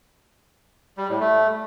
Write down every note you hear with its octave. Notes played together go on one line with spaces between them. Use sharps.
G3
A2
A3